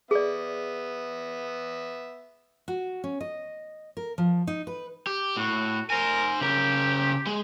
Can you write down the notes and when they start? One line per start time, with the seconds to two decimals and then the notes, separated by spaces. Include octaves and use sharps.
0.11 B3 G#4 D5 E5
2.68 F#4
3.04 C#4
3.21 D#5
3.97 A#4
4.18 F3
4.47 D#4
4.67 B4
5.07 G4
5.37 A2 F#4
5.90 A#4 C5 G#5
6.41 C#3 G4 A#4
7.27 G#3